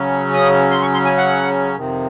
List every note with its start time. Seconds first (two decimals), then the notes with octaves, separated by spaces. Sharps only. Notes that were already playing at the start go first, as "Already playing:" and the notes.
Already playing: C#3 F#3 C#4
0.34 D#6
0.71 C6
0.81 C#6
0.94 C6
1.05 G#5
1.17 F#5
1.76 F2 C3 D#3